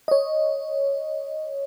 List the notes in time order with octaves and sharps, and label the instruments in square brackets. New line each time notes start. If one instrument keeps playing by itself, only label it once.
[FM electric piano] C#5 D#5